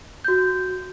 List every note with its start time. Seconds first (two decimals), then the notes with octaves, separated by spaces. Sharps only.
0.25 F#4 G6